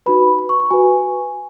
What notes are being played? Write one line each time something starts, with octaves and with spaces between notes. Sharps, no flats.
D#4 F#4 B4 B5
B5
C#6
C#6
F#4 B4 G#5